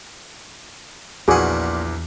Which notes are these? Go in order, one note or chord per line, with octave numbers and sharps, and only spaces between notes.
A#1 E2 A#2 E3 F#4 G#4 F#5 D6